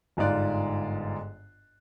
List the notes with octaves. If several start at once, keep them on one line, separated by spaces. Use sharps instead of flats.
G1 G#2 D#4 F4 D5 F#6